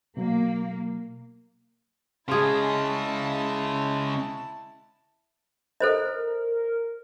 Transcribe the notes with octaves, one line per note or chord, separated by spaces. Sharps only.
B2 F#3 A#3
C#3 G#3 E4 F4 G#4 A5
A4 A#4 C5 D#5